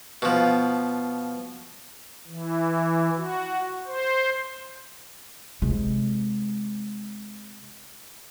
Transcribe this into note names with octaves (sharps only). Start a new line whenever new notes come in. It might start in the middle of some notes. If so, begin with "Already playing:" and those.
B2 F3
E3
F#4
C5
C3 G#3